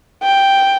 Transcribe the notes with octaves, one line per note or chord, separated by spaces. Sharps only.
G5